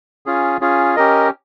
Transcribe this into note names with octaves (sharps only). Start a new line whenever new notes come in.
C#4 F4 G#4
C#4 F4 G#4
C#4 G4 A#4 D#5